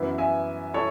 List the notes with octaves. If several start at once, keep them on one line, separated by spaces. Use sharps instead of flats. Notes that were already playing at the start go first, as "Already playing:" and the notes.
Already playing: F#2 E3 B3 E4
E5 G#5
E4 A4 C#5